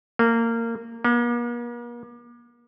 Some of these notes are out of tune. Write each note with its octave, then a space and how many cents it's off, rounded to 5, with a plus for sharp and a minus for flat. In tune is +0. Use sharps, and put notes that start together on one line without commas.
A#3 -20
A#3 +45